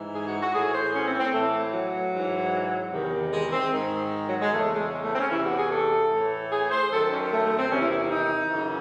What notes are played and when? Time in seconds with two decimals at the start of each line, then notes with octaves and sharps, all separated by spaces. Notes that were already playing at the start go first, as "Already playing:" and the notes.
Already playing: G#2 E3
0.14 G#4
0.26 F#4
0.41 F#4
0.53 A2 E3 G#4
0.74 C5
0.93 C#4
1.06 C4
1.19 C4
1.33 A2 E3 A3
1.73 F#3
2.13 G#2 E3
2.92 E2 C3 D#3
3.33 G#3
3.52 C4
3.72 G#2 D#3
4.27 F#3
4.40 G#3
4.52 E2 C#3 E3 A3
4.72 G#3
4.92 G#3
5.04 A3
5.13 C4
5.18 C#4
5.31 E2 C3 E3 E4
5.44 F#4
5.57 G#4
5.71 A4
6.11 A2 E3
6.51 G#4
6.71 C5
6.91 F#2 D#3 A4
7.11 C#4
7.31 A3
7.44 A3
7.58 C4
7.70 E2 C3 D#3 C#4
7.80 E4
7.90 E4
8.01 E4
8.10 D#4
8.50 F#2 C#3 E3